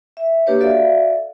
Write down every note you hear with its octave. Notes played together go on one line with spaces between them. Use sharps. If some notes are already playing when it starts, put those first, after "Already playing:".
E5
A#3 D4 G4 B4 C#5
F#4 A4 D5 E5 F5